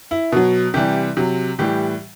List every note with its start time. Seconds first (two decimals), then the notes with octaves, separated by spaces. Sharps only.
0.11 E4
0.32 B2 F#3
0.74 C3 E3 G3 G4
1.17 C3 F#3
1.59 A2 E3 G3 G4